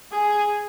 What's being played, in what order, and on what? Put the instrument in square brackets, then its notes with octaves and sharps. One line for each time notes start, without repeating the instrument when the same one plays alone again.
[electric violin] G#4